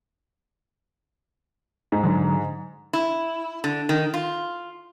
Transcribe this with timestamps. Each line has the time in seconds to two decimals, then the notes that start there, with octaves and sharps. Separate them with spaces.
1.92 G#2
2.04 D3 F#3
2.93 E4
3.64 D3
3.89 D#3
4.14 F4